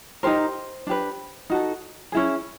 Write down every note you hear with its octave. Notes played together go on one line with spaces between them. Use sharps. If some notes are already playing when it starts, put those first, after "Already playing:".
D#4 G4 A#4 C5
D4 G4 B4
D#4 F#4 A4
C#4 E4 G#4